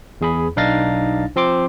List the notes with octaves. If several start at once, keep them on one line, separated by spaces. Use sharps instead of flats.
E2 G#4 B5
B1 D4 D#4 F5 A6 A#6
F3 C4 C6 D6